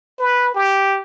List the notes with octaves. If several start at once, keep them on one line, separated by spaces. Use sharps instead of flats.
B4
G4